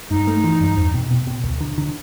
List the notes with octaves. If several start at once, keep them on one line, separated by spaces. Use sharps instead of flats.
G2 D#4
A3
E3
G2
E2
B2
B2
B2
D2
D3
D3